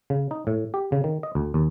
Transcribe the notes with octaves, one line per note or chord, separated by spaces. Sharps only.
C#3
D#4
A2
G4
C#3
D#3
D#5
D2
D#2